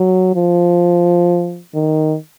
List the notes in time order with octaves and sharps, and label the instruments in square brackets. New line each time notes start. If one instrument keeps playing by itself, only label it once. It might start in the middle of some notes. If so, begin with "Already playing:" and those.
Already playing: [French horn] F#3
F3
D#3